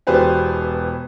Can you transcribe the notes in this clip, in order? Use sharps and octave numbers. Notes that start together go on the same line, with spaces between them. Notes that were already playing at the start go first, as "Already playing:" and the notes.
E1 B2 G4 B4 C5 G#5